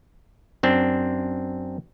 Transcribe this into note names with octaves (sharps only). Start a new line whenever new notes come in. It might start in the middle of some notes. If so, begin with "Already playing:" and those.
F#2 C4 D4